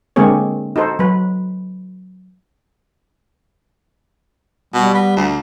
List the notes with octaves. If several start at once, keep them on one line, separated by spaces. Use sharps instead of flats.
D3 G#3 A#3 C4 G#4 C#5
D#4 F#4 A4 C5
F#3 B4
B2 G3
B3
D2